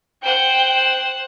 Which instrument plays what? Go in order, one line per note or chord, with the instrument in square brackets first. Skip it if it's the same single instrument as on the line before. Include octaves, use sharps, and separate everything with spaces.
[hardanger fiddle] C5 F#5 [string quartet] G5